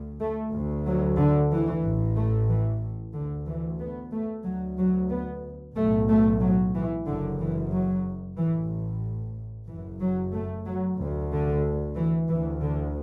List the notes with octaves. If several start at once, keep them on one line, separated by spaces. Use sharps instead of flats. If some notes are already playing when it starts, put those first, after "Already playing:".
Already playing: D2
A3
D2
F#3
D3
E3
A1 A2
A3
E3
D2 D3
E3
B3
A3
D2 F#3
F#3
B3
B1 A2 A3
A3
F#3
E3
F#1 F#2 D3
E3
F#3
A1 A2 E3
F#1 F#2 E3
F#3
A3
F#3
D2
D3
E3
D2 E3
D3